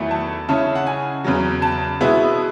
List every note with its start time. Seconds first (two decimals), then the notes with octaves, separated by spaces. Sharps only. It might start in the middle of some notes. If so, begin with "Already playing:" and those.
Already playing: E2 D#3 F#3 A3 E4
0.11 A5
0.49 C#3 G#3 C#4 E4 A5
0.75 F#5
0.87 G#5
1.24 E2 C#3 F#3
1.62 A5
2.01 B2 G#3 B3 E4